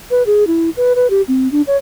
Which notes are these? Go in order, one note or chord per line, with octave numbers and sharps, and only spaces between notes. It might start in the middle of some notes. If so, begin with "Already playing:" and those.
B4
G#4
E4
B4
B4
G4
C4
D4
C#5